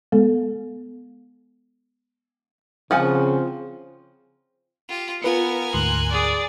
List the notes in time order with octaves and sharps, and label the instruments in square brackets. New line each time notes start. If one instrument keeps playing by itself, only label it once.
[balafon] G#3 B3 A4
[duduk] C#3 [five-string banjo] F3 F#5 G#5 [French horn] C4
[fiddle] F4 G4
[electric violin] B3 [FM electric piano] F4 B4 C#7 [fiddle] A#4 G#5
[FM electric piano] D2 G#2 C6 [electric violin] F#6
[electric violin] G#4 D5